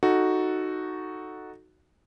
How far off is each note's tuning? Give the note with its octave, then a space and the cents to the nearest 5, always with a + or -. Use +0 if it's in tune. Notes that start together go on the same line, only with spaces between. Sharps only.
D#4 +0 F#4 +0 A4 +0